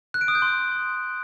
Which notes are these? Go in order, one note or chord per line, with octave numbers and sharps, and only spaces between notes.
F#6
D7
D#6
G6
C6